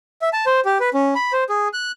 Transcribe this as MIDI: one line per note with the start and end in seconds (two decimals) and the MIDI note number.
0.22 0.29 76
0.33 0.45 81
0.46 0.60 72
0.65 0.78 67
0.80 0.89 71
0.94 1.14 61
1.15 1.32 83
1.33 1.44 72
1.49 1.68 68
1.73 1.92 90